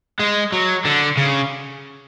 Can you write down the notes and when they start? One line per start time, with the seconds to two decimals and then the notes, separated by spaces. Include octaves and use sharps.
0.20 G#3
0.53 F#3
0.85 D3
1.17 C#3